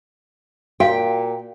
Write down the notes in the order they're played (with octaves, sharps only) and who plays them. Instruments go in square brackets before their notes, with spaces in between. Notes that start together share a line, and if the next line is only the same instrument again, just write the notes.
[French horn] A#2 [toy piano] F#4 F5 [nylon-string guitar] G5